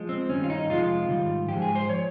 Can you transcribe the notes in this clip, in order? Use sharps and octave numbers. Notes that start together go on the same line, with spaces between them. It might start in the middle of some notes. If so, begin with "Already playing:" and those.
Already playing: F3 G#3
C4
G2 D#3 G3 C#4
F4
D#4
F2 C3 F3 G#3 F4
G#2 D#3 G3
G#2 F3 G#3 G4
G#4
C5
F3 C#5